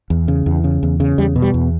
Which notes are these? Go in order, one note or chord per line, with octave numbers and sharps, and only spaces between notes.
E2
C#3
E2
C#3
E2
C#3
E2 G3
B2
G3
E2